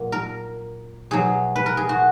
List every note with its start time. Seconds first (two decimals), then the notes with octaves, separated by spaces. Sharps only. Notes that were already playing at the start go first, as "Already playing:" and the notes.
Already playing: A#2 F#3
0.12 A#4
1.11 B2 F#3 G#4
1.56 B4
1.66 A#4
1.77 G#4
1.89 F#4